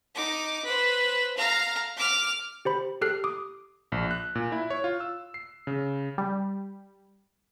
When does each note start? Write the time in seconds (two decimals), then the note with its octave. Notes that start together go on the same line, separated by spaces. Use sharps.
0.15 D#4 D6
0.64 B4 C5
1.37 F5 A#5
1.97 D6 F6
2.65 G4 C5 B5
3.02 G4 A4 F6 F#6 C7
3.24 D6 D#6
3.92 A#1
4.11 F#6
4.35 A#2
4.52 E4
4.70 C#5
4.84 F4
5.00 E6
5.34 C7
5.67 C#3
6.18 G3